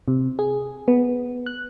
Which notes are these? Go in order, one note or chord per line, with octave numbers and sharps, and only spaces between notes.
C3
G#4
B3
F#6